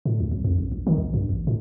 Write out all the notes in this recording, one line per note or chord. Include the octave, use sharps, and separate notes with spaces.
A2
C#2
C2
F2
A#1
A#1
D#3
B1
G2
A1
A2